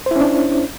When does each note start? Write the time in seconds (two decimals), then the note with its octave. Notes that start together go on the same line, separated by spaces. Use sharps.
0.06 C5
0.11 E4
0.16 C#4
0.21 D4